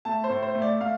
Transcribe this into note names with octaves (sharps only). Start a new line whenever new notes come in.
A3 A5
C5
A2
C5
A3
D5
A3 F5